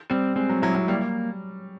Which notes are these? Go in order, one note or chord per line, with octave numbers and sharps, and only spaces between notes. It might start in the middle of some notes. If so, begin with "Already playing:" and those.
G3 C4
G#3 C4
F#3
F#3 E4
F#3
G3 A#3